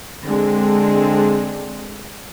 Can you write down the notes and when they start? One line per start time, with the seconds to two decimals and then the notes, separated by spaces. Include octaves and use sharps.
0.25 D3 G#3 C4 D4